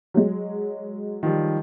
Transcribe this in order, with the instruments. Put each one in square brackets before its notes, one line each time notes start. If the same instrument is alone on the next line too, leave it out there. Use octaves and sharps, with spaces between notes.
[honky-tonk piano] F#3 G#3
[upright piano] D#3 F3 G3